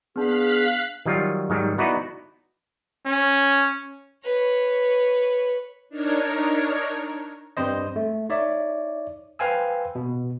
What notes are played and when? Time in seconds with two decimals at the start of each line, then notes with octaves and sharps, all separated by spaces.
0.16 B3 D4 G#4 F5 F#6 B6
1.06 D#3 F#3 G3 F4
1.50 G#2 D#3 F#3 G3
1.78 B3 D#4 E4 F#4 B4 D5
3.06 C#4
4.24 B4 C#5
5.89 D4 D#4 A#4 C#5
7.57 G2 G3 C4 C5 D#5
7.96 A3
8.29 D#4 C#5 D5 E5
9.39 B4 C5 F5 G5 G#5 E6
9.95 B2